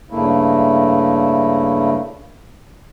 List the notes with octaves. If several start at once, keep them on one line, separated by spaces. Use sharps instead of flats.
G2 C#3 A3 A#3 E4